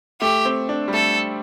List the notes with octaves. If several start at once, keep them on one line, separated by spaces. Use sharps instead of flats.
A3 G4
C4
D4
G3
A3 A4